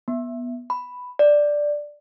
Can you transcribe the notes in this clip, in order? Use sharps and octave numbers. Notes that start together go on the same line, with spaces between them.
B3
B5
D5